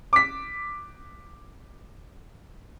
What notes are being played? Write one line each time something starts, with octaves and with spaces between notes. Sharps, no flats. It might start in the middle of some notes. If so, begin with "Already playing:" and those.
D6 B6